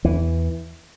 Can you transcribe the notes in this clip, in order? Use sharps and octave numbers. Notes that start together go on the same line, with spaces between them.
E2 E3